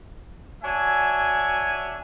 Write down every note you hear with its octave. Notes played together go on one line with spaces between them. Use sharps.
D4 F#4 C#5 E5 G#5